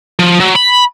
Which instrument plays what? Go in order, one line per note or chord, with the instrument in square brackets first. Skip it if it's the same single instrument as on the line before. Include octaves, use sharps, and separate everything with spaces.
[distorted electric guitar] F3
F#3
B5